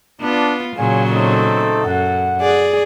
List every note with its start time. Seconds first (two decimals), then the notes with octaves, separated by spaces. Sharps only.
0.20 B3 D4 F4
0.76 A#2 C#3 F#3 F4 G#4 G#5
1.12 A3 C4 D#4 A4
1.84 F#2 F#5
2.41 G#4 D5